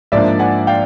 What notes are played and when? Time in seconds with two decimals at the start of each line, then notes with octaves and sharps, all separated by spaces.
0.12 G#2 F3 A#3 D4 D5 E5
0.39 F#5 G#5
0.67 F5 G5